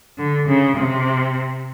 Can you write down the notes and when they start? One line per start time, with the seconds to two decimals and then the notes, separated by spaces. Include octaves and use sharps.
0.18 D3
0.48 C#3
0.76 C3